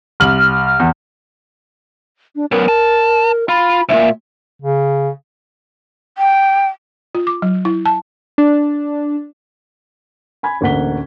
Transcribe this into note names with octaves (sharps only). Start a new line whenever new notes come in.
C2 F6 F#7
E2
D4
F#2 B3 A#4
A5
F4 B5
C2 A#2 E5
C#3
G5
F4
D6
F#3
E4
A5
D4
G#5 B5 G#6
A1 D2 A#3 F#5 B6 G7